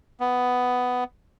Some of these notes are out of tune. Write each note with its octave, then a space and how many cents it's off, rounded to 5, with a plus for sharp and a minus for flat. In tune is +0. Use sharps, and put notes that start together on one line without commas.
B3 +10